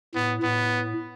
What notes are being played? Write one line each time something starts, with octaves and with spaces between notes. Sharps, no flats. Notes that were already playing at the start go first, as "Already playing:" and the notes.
A2 B3
A2 B3